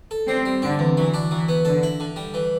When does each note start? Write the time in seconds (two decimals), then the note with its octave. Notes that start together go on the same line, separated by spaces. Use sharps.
0.11 A4
0.28 G3 C4
0.46 G3
0.62 D3 C4
0.79 E2
0.96 E3 F#3
1.14 D4
1.31 E3 F#3
1.48 B3
1.65 D3 A4
1.83 E4
2.00 D3
2.16 G3
2.34 E3